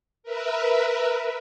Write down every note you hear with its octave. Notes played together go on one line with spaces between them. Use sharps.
A#4 B4 E5